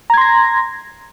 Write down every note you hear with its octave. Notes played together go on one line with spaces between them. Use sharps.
A#5 C6 G#6 A#6